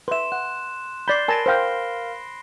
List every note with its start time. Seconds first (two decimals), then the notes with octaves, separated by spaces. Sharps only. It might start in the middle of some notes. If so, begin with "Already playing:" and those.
0.08 B4 E5 C6 E7
0.32 F#5 F#6
1.08 D5 B5 G6 A6 C7 G7
1.28 A#4 G#5 A5 B5 A#6 D7
1.46 A#4 C5 F5 G5 F6